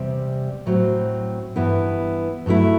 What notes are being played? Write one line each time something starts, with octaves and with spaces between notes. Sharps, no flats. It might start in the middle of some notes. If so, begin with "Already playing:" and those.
Already playing: E2 C3 G3
A2 F#3 C4
G2 E3 B3 E4
G2 F#3 A3 E4